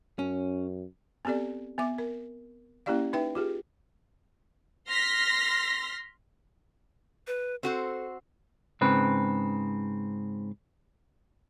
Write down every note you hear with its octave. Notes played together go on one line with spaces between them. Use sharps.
F#2 C#4
B3 C4 G4 A4 D5
B3 E5 D6
A#4
A#3 C#4 E4 G4 D5 F5
D#4 B4 E5 G5
F4 G4 G#4
C6 F6 A#6 B6
B4
C4 F#4 A4 C5
G#2 C#3 C4 B4